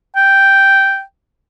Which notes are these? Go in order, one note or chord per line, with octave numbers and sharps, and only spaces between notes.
G5